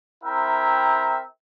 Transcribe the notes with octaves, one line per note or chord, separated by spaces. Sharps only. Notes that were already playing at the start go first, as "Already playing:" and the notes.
C4 E4 A#4 E5 G5 A#5